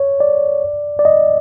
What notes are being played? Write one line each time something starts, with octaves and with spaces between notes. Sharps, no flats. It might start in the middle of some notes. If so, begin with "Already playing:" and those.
Already playing: C#5
D5
D5
D#5